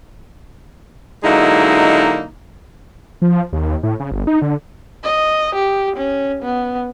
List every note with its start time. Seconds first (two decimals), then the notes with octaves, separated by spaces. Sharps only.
1.23 D3 F#3 G#3 A#3 D#4 E4
3.22 F3
3.53 D#2
3.83 A2
4.00 C#3
4.11 G1
4.27 D#4
4.42 D3
5.03 D#5
5.55 G4
5.96 C#4
6.42 B3